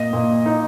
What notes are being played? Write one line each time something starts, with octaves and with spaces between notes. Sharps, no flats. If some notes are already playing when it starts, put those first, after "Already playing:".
Already playing: A#2 D#5
A#2
D#4